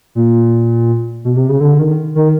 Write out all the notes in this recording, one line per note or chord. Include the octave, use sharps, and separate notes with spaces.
A#2
B2
C3
C#3
D3
D#3
D#3